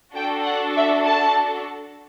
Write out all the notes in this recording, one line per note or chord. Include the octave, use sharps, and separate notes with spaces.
D4 F#4 A4 G5
F#5
E5
A5